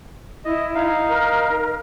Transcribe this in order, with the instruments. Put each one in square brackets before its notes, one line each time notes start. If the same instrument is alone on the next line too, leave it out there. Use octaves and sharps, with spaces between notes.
[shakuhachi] E4 [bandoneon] D#5
[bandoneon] D#4 F5
[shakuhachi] A#4